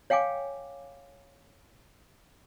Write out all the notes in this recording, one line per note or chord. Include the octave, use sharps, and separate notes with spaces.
C#5 F5 G5 G#5 D6